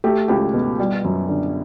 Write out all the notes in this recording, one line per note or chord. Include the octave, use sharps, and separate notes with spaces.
A3 G4
C#2 G4
B2
G3
F#2
D3